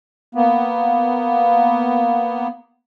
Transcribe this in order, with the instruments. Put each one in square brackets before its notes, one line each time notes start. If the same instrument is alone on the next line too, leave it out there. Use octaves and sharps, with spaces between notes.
[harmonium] A#3 B3